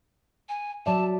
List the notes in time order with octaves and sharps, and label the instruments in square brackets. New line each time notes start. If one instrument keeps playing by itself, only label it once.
[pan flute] G#5
[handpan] F#3 D5 E5 [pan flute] A5